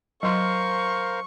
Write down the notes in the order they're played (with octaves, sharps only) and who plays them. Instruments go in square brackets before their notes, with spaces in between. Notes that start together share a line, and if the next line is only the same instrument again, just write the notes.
[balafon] F#3 C6 [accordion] A#4 C5 F5 [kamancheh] C#6